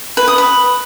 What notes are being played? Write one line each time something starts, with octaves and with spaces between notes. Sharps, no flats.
B4
D#6
B4